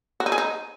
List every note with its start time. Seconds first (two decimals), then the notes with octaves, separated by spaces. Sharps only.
0.20 F#4
0.26 D#4
0.32 G#4
0.38 D#4